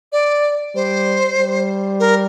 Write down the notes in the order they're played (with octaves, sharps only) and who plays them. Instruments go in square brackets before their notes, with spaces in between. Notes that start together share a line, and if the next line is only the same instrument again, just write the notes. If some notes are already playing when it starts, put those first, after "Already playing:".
[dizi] D5
[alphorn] G3 [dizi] C5
[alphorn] G3
[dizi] A#4